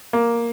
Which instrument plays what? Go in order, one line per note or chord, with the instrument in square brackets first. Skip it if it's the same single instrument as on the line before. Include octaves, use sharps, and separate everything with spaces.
[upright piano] A#3